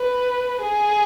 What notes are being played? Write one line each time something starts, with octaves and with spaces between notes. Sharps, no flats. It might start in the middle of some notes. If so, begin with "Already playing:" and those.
Already playing: B4
G#4